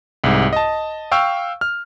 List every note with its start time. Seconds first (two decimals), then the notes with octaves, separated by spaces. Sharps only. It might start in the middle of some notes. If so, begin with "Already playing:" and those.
0.24 C2 G#2
0.53 D#5 A5
1.11 F5 G5 C#6 E6 F6
1.61 F6